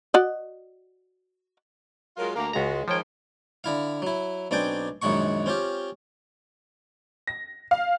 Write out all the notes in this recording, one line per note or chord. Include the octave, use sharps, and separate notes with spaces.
F#4 D5 D#5
F#3 G#3 F4 A#4
D2 A#3 A#5
C#2 G#3 F#4 A#5
G#2 D#3 F3 C#5 G5
D3 E4 F5
F#3 E4
B1 C4 D4 D5 G5 G#5
A#1 F#2 D#3 G#3 F#5 C#6
C4 C#4 F4 G4
A#6
F5